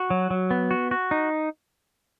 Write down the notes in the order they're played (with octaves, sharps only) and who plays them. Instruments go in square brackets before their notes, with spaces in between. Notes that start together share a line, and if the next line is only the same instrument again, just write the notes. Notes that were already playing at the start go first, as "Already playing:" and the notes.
Already playing: [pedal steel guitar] F#4
F#3
F#3
B3
F#4
F#4
D#4